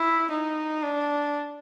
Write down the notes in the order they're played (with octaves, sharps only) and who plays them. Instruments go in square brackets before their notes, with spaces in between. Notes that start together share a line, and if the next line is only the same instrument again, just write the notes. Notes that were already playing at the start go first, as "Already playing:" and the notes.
Already playing: [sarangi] E4
D#4
D4